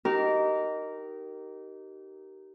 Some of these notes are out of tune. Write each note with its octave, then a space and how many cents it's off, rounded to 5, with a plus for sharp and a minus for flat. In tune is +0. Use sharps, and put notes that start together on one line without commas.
D#4 +0 G4 -30 A#4 -5